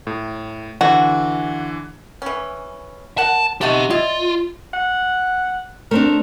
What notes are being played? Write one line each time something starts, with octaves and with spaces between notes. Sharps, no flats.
A2
D3 E3 F#4
E3 C#4
A#4 F#5 A5
D#4 F#4 G4 E5 A5
E4 F4 D5 D#5
F#5
A3 C4 D4 A#4